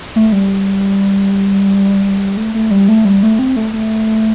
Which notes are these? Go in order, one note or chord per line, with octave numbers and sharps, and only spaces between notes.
A3
G3
A3
A3
G3
A3
G3
A3
C4
A3
A3